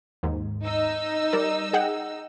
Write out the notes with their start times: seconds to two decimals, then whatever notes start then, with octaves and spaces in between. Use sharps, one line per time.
0.23 D#2 G#2
0.65 D#4 D#5 E6
1.33 G3 A#4 D5
1.73 G#4 F#5 G5